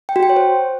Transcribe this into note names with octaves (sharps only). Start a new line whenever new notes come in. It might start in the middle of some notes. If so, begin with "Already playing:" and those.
G5
F#4
G5
C#5
C5